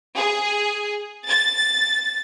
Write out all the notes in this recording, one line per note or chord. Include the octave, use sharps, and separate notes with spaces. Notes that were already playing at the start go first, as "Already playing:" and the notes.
G#4
A6